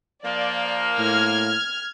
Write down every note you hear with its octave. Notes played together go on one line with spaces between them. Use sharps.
F3 A#3 D5
A2 F6 G#6